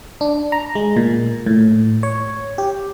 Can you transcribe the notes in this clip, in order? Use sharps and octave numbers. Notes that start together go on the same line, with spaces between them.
D4
A#5
G#3
A#2
A2
C#5
G4